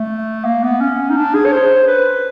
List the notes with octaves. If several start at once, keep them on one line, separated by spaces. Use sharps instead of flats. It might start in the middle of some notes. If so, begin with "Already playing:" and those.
Already playing: A3
A#3
B3
C#4
D#4
D4
G#4
C#5
C5
B4